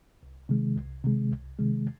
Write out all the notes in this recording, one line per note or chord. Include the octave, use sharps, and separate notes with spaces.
C2
C3 D#3 G#3
C2
C3 D#3 G#3
C2
C3 D#3 G#3